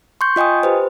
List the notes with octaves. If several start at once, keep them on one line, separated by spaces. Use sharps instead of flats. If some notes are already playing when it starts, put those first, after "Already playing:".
C6 C#6 G6
F4 D#5 G5 G#5 D#6
G4 B4 C5